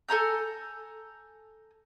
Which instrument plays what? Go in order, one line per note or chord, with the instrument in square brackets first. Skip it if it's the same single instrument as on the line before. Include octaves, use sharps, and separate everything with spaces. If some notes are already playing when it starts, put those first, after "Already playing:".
[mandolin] A4 G#5 A#5 G6